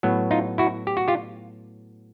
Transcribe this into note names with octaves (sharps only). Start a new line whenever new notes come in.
A2 F#3 B3
D#4 F4
E4 F#4
G4
F#4
F4 G4